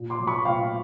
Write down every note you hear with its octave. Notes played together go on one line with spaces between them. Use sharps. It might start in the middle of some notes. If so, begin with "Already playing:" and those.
Already playing: A#2
C6 D6
F#3 A3
B5 C#6
A#2 F5 G5